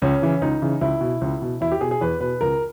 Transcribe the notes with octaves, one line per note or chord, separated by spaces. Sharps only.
C#2 C#4
C#3 E3
C#2 D#4
C#3 E3
C#2 E4
B2
C#2
B2
E2 E4
G4
B2 G#4
G#4
E2 B4
B2 B4
C#2 A#4